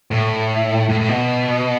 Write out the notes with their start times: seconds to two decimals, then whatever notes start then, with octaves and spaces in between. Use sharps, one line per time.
0.11 A2
0.89 A2
1.00 A2
1.09 B2